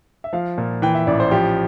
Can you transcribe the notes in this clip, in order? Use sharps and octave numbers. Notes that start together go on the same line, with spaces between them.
E5
F3 F5
A#2
E3 G5
E5
A1 D5
C5
F3 G4